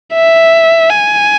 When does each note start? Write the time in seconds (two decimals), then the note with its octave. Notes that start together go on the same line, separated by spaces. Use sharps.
0.13 E5
0.90 G#5